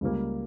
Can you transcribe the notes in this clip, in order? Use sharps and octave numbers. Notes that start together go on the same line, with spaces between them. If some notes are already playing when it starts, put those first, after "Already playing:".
C#2 C#3 G3 A#3